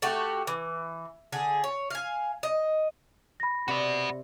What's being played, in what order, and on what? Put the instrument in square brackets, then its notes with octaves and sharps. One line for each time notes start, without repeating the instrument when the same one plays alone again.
[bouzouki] A3 F#4 G4
E3
D3 G#4 G#5
C#5
F5 G#5
D#5
[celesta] B5 A#6
[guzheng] C3 D5 [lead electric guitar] F#4 B4